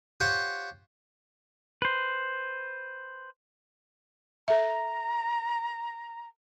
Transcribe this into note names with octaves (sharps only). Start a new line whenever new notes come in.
F4 G4 C5 C#5 F#5 G5
B4 C5
A4 E5 A#5